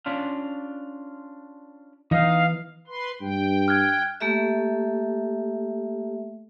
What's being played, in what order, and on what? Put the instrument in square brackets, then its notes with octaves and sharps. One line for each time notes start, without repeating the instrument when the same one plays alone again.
[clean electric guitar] C#4 D4 F4
[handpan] E3 [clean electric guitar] D#4 D#5 [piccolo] F5
[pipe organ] B4 C6
[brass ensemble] G2 [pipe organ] G5
[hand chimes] F6 F#6 G#6
[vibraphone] A3 A#3 G4 A4 E5